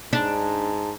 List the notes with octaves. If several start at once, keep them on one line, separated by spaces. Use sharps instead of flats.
G#2 D4 A5